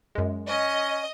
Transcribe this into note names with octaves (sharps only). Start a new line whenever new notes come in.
F#2 G#3
C#4 D#5